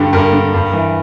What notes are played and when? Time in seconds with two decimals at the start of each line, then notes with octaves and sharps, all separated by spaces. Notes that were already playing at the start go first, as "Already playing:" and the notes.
Already playing: G2 D3 G4
0.13 G2 A#4
0.33 D3
0.54 G2
0.73 E3